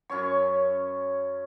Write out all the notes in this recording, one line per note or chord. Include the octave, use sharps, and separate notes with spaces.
F#2 C#4 C#5 C#6